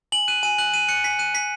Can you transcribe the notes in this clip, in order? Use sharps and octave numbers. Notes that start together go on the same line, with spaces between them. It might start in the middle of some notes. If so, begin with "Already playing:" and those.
G#5 F#7
F#6 D#7
G#5 D#7
F#6 F#7
G#5 D#7
F#6 C#7
G#5 B6
F#6 D#7
G#5 B6